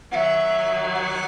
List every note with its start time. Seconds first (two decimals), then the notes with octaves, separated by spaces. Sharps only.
0.12 D#3 F#3 E5 F#5
0.94 F#5